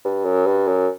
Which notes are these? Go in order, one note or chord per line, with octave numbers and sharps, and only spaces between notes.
G2
F#2
G2
F#2